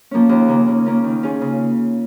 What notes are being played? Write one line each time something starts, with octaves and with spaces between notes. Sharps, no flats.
F3 A#3 C#4
D#2
C#3 A#3
C#3
A#3 C#4 F4
D#3
C#4 F4 G#4
C#3